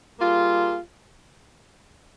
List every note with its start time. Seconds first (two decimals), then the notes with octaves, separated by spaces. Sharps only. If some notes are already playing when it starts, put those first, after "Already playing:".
0.18 G3 A#3 F4 G#4